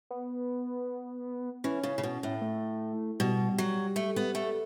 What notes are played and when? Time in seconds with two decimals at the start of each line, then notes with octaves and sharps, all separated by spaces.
0.10 B3
1.64 E3 C#4
1.83 C#3
1.98 C#3
2.03 B2
2.23 A2
2.41 A3
3.20 B2 G3
3.58 F#3
3.96 A3
4.16 B3
4.35 A3